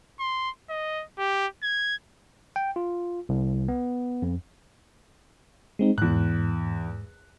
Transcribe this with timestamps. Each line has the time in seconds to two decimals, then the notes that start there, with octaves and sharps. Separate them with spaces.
0.20 C6
0.70 D#5
1.19 G4
1.63 G#6
2.56 G5
2.76 F4
3.29 C2
3.68 B3
4.22 F2
5.79 G#3 C4 D#4
5.98 E2 G#2 F#6